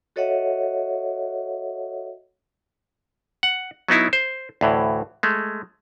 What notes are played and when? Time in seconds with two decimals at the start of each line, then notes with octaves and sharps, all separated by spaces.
0.16 F#4 A4 C#5 D#5 E5 F#5
3.43 F#5
3.88 F#3 B3 D#4 E4
4.13 C5
4.61 D2 A2 E3
5.23 G#3 A3